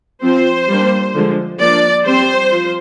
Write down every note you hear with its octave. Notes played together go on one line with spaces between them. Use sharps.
F3 C4 C5
G3 A#3 D4
D3 F3 G#3
F3 A#3 D4 D5
G3 C4 C5
F3